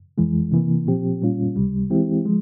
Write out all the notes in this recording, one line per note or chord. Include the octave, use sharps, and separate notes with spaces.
F2 E3 G#3
C3 E3 A#3
A#2 F3 C4 G4
A#2 G3 C#4 F4
C#2 C3 G3
E3 G#3 C4 E4 G4
F3 G#3